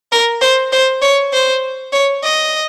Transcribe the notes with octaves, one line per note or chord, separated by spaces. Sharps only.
A#4
C5
C5
C#5
C5
C#5
D#5